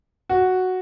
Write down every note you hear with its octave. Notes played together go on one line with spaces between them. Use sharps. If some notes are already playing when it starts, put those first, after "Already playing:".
F#4